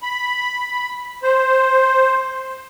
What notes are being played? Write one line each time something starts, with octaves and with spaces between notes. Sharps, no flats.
B5
C5